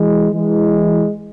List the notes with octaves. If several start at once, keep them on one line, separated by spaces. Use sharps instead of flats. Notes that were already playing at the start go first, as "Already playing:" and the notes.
Already playing: E3 G#3
E3 G#3